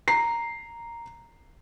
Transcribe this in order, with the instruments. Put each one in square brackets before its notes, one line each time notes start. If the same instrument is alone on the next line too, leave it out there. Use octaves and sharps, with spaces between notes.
[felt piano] A#5 C7